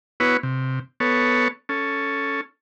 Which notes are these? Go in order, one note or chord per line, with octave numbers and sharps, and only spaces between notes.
B3 E4 F#4 B4 C#5
C3
B3 A4 C#5
C#4 A4